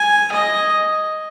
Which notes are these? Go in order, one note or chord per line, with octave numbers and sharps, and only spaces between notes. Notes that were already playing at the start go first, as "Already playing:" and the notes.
Already playing: G#5
D#5